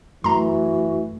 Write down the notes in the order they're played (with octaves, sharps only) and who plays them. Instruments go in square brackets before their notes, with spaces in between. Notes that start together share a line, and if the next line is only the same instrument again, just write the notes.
[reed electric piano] F#2 A3 [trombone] E3 [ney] F#4 [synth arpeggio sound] A#5 C6